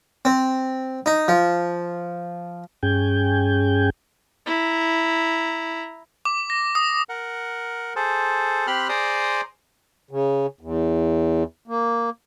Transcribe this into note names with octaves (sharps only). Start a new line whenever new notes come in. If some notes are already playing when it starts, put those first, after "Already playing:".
C4
D#4
F3
G2 C#4 G#4 G5 G#5 G6
E4 A#5
D6
A#6
D#6
A#4 F#5
G#4 A4 C5
C4 G4 B5 C6 F6 F#6
G#4 C5 D5 A#5 C6 D#6
C#3
E2
A#3